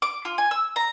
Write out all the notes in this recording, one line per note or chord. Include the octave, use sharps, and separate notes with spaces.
D6
F4
G#5
E6
A#5